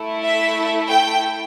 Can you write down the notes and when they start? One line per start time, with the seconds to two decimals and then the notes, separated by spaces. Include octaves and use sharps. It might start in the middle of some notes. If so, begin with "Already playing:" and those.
Already playing: A3 E4 A4
0.22 E5
0.90 G5